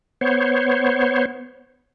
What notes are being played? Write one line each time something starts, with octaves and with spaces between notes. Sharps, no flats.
B3 C5 C#5